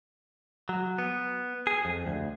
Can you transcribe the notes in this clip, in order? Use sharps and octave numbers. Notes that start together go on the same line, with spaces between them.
F#3
B3
G#4
F2
D2